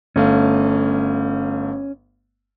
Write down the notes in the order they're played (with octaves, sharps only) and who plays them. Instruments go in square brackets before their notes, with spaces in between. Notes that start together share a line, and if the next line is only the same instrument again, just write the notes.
[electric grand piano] G1 A3 F5 [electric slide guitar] C#4